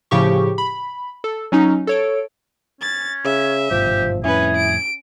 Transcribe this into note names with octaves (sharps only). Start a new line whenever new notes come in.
A2 C#3 F3 G4 C#6
B5
A4
F#3 C#4 D#4
A4 C#5 D7
C#4 A6
C#3 E5
G#1 G2 B2 F3 G4
F2 A2 C#4 E4 G#4 B4
D7